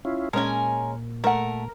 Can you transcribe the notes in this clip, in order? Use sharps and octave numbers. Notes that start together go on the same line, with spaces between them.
C#4 E4 F4
A#2 G#3 C#4 A#4 G#5
A3 A#4 F#5